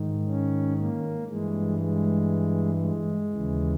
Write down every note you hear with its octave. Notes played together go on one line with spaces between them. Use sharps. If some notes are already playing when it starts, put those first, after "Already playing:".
Already playing: G#2 D#3
C#4
A#3
G2 E3 G#3
G#3
G#3
D#2 C#3 E3